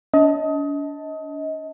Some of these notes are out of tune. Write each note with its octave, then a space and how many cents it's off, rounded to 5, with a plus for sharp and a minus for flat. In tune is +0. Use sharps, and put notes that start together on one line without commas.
D4 -40 D#5 +25 A5 +0